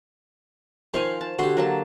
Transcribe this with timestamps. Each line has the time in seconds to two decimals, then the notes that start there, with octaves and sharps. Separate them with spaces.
0.94 D#3 F3 C5 F5 G#5
1.21 A5
1.39 D3 F#4 G4 C6
1.57 F#3 A#3 A5